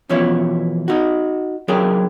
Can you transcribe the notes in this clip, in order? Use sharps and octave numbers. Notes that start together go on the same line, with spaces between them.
E2 B2 F3 C#4 E4 C#5
D#4 F#4
C#3 F#3 D4 G#4 A#4 G5